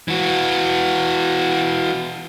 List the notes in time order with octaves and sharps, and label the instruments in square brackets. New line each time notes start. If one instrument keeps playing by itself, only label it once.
[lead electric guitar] E3 F#4